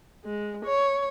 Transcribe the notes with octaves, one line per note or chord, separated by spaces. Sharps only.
G#3
C#5